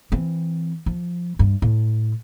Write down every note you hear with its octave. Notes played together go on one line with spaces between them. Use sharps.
E3 C4
F3
G2
A2